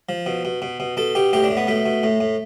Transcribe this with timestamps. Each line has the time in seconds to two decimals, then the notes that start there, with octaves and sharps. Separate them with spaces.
0.09 F3
0.26 B2
0.45 B2
0.62 B2
0.80 B2
0.97 B2 A4
1.15 B2 G4
1.33 A2 G4
1.44 D4
1.51 A2
1.57 B3
1.68 B2 A3
1.86 B2
2.03 A2
2.20 A2